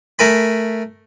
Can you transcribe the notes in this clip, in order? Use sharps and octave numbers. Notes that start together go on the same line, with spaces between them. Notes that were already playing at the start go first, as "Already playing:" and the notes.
A3 A#4 G#5 B5